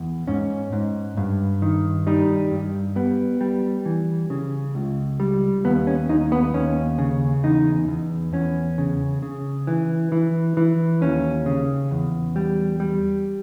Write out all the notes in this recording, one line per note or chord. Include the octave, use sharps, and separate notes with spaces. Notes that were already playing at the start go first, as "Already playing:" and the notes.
Already playing: E2
G#2 C#4
G#2
G2
D#3
G3 D#4
G2
G3 B3
G3
E3
C#3
C#2
G3
D#2 B3
C#4
D#2 D#4
B3
D#2 C#4
C#3
E2 D#4
E2
E2 C#4
C#3
C#3
E3
E3
E3
D#2 C#4
C#3
E2
G3
G3